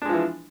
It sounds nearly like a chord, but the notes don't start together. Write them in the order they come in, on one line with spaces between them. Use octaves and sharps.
D4 G#3 F3 E3